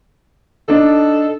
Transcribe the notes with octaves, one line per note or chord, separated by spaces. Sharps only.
D4 D#4 A4